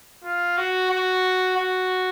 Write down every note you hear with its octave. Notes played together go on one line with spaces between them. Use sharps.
F4
F#4
F#4
F#4